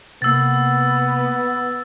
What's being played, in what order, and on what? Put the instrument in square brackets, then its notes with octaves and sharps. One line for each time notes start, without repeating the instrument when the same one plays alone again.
[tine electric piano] C3 A#3 [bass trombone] B3 [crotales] E6 A6